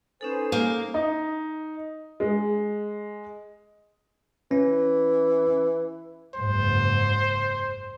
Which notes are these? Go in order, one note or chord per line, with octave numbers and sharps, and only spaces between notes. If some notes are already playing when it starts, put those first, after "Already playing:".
C#4 D#4 A4 B4 C5 G#5
A#3
D#4
G#3
E3 C#4
F#1 C#2 G#2 C5